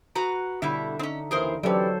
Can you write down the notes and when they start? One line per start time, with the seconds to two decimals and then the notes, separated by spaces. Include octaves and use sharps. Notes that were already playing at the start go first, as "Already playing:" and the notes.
0.15 F#4 B4 A#5
0.62 B2 D3 G3 D4 E4 E5
0.99 C4 C#4 D#4
1.31 D#2 C#3 E3 G#4 A#4 C5
1.63 E3 F#3 C#4 G4 A4 B4 C5 D5